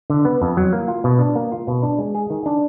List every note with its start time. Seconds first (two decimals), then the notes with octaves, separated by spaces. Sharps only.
0.10 D3
0.25 B3
0.42 F2
0.57 F#3
0.73 A#3
0.88 F4
1.04 B2
1.19 D4
1.35 A#3
1.52 F4
1.67 B2
1.83 D4
1.99 G#3
2.15 G#4
2.30 D#3
2.46 D4